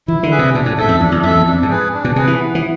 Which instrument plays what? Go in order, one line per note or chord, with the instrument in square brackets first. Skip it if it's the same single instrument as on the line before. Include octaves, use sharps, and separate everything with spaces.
[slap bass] E3 [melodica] E4
[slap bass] D3
[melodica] G#4 B4 E5
[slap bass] C3
[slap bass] B2 [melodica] D4
[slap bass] A2
[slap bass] G#2 [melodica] A4 E5
[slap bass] F2
[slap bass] E2 [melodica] D4
[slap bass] E2
[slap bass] F2 [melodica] A4 E5
[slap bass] E2
[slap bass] F2 [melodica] D4
[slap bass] G#2
[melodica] G#4 B4
D4
[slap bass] B2
[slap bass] C3 [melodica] G#4 B4
[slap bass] E3
[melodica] B3
[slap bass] E3